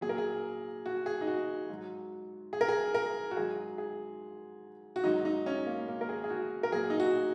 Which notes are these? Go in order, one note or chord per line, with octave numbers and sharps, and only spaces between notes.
A#2 F#3 G#4
A#4
G#4
F#4
G#4
D#4
F#4
G#2 F#3
G#4
A#4
G#4
A#4
F#4
G#2 F#3 G#4
G#4
F#4
G#2 F#3 D#4
D#4
C#4
A#3
A#3
A#4
G#4
G#4
F#4
A#4
A#2 F#3 G#4
D#4
F#4